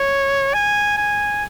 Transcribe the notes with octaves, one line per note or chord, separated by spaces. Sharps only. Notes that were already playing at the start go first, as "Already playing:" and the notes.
Already playing: C#5
G#5
G#5